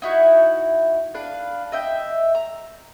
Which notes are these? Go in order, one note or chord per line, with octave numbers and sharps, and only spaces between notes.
D#4 E4 F#4
D4 B4 F5
D#5 E5 G5
A#5